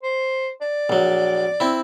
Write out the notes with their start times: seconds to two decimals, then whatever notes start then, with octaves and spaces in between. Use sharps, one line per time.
0.03 C5
0.61 D5
0.90 A#1 F#3
1.60 C4 E4